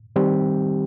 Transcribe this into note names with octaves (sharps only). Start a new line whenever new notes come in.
D#3 G3 C4 G4